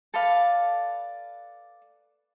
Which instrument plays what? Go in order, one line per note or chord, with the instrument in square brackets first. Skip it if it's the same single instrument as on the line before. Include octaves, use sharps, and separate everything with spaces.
[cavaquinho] A4 B4 D5 F5